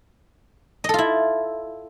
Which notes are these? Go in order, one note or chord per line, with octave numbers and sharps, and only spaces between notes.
E4 F4 A4 D#5